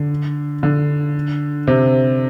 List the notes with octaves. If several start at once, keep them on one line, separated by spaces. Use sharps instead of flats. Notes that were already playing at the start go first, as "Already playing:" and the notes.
Already playing: D3
D3
C3